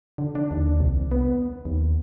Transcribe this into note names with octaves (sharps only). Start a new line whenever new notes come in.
D3
D4
D#2
C2
B3
D#2